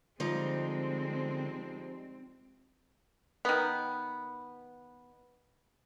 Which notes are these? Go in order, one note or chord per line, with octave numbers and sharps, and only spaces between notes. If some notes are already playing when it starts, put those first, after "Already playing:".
D3 F3 G3 G#3 C4 D#4
D#3 B3